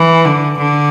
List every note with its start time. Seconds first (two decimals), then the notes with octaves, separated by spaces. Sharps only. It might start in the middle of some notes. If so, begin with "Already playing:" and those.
Already playing: E3
0.25 D3
0.59 D3